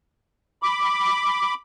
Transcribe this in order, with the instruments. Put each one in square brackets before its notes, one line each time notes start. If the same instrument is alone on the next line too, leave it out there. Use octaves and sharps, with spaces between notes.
[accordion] B5 D6